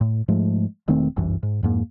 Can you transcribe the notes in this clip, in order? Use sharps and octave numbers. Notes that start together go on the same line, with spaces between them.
A2
G#2 F3 G#3 A3
E1 D#3 A3 C4
G1 C2 F#2 E3
G#2
F2 G#2 A#3